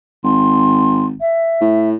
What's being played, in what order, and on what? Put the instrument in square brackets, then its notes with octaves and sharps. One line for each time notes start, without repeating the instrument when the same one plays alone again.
[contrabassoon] G#1 [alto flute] C6
[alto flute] E5
[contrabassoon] A2